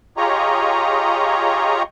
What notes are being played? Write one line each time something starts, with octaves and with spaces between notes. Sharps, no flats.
F4 G4 G#4 C#5 D#5 A#5